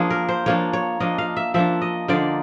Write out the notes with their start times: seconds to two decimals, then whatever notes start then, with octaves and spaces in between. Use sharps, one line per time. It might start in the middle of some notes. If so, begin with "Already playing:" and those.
Already playing: F3 A#3 D4 G#4
0.10 A#4
0.29 C5
0.46 F3 A#3 D4 C#5
0.73 C#5
1.00 F3 A#3 D4 D#5
1.18 F5
1.37 E5
1.54 F3 A#3 D4 E5
1.82 D#5
2.08 D3 F3 A#3 D#4 D5